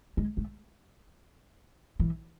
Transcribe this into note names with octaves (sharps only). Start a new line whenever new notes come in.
G#3
A3
E3